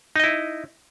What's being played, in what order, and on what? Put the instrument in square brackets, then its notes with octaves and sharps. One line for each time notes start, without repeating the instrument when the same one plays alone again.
[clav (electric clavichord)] D#4
D#5
E4